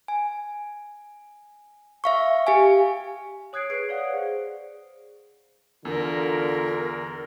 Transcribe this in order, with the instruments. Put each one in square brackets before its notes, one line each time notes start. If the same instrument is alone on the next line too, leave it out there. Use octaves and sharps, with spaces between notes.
[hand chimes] G#5
E5 F5 C#6
G4 F5 G#5
[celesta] C#5 D#6 F#6 G#6 C7 D7
G#4 B4 C7 D7
C#5 D5 F5 F#5
G#4 C5
[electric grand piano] E2 [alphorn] D3 [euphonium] F4 [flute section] A#4